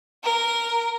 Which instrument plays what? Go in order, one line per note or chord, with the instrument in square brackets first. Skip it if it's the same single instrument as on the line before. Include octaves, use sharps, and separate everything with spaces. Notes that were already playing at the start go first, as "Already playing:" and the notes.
[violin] A#4